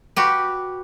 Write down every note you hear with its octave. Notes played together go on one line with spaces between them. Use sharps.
F#4 G4 B4